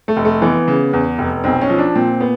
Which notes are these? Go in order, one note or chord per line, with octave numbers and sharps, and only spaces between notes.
A3
F1
A3
E3 B3
C#3
E2
F1
B1 C4
C#4
F3
D4
A#2 C4
B3